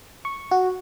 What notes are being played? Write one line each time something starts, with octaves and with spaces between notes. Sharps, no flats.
C#6
F#4